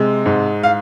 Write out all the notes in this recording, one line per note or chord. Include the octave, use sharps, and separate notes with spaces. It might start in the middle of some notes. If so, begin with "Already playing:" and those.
Already playing: C3 G#3
G#2
F5